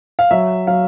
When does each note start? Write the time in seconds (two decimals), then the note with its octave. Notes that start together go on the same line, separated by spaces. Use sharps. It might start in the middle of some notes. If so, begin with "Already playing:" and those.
0.19 F5
0.31 F#3 E5
0.67 F#3 F5